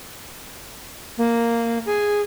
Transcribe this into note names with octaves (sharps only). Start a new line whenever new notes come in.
A#3
G#4